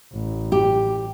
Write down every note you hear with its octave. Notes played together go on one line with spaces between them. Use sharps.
A1
G4